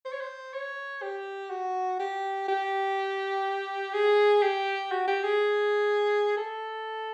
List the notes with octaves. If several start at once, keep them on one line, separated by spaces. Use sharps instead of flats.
C5
C#5
C5
C#5
G4
F#4
G4
G4
G#4
G4
F#4
G4
G#4
A4